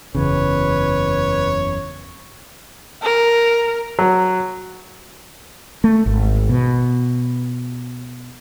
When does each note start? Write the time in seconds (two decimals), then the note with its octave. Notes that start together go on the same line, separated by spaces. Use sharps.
0.15 F#1 E2 C#3 B4 C#5
3.03 A#4
3.99 F#3
5.84 A3
6.06 G#1
6.49 B2